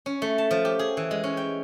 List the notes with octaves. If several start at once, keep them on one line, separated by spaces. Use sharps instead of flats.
C#4
A3
A5
F3
G4
G#4
E3
G#3
C#4
G5